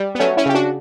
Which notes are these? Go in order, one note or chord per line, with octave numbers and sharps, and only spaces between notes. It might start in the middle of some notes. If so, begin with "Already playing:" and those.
Already playing: G3
B3
F#3 A3 C#4
C#4 E4
C#3 G4
D4 F#4